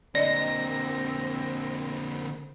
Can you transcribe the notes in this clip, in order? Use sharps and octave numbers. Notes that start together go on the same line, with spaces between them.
D3 A#3 C4 D5 D#5 A#6